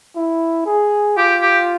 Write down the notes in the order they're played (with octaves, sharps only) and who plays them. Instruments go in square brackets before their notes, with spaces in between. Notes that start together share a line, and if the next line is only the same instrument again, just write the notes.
[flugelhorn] E4
G#4
[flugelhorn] F4 [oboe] G4
[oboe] G4